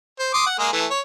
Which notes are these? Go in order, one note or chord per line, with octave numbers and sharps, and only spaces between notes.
C5
C6 D6 D#6
F#5
G#3 A#3 G#4
E3 A3
C#5